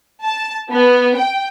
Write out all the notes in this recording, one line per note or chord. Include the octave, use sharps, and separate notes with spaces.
A5
B3
G5